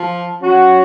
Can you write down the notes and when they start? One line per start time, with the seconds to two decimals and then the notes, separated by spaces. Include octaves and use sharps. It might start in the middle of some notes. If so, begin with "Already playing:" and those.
Already playing: F3
0.41 F#3 C#4 F#4